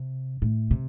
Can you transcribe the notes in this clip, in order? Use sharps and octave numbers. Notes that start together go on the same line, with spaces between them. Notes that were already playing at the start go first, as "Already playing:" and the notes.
Already playing: C3
A2
C3